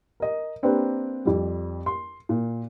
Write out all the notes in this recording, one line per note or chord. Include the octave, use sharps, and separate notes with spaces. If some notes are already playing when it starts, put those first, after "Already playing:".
A#4 D#5
A#3 C4 D4 G4 A#4 B4
F2 G3
C6
A#2